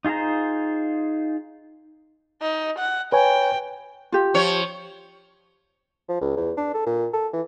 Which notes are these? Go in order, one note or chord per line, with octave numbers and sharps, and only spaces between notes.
D#4 F4 G#4 C5 A#5
D#4
F#5
B4 C#5 G5 G#5
F4 G4
F3 C#5
F3
C#2
E2
D4
A4
A#2
A4
E3